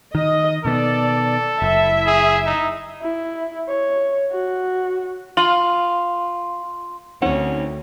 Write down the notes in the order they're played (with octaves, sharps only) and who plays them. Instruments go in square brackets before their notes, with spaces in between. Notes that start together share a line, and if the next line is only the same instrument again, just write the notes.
[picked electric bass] D#3 [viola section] D#5
[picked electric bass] B2 D#3 B3 [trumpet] A4 [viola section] D5
[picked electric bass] F#1 [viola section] E4 E5
[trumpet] G#4
D#4
[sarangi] E4
C#5
F#4
[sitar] F4 [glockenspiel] C6 F#7
[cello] D2 [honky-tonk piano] D#3 C4 [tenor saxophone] C#4 [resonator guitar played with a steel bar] C#5 F#5